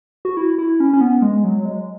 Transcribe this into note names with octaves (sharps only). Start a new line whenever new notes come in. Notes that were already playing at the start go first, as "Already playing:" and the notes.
F#4
E4
E4
C#4
C#4
B3
G#3
F#3
G#3